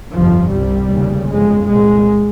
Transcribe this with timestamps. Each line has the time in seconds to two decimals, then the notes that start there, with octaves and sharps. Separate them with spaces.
0.13 G1 F2 C3 F3
0.52 C2 C3 G3
0.91 F1 D#2 C#3
1.28 G1 F2 C#3 G#3
1.67 C2 A#2 G#3